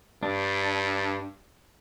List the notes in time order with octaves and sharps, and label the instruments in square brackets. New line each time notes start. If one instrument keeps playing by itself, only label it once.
[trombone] G2 [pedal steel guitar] D4